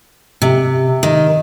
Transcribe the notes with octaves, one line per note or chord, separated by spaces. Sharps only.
C3
D#3